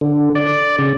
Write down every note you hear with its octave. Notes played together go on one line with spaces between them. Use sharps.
D3
D5
C#3